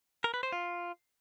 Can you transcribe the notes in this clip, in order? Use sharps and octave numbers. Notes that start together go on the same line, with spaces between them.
A#4
B4
C5
F4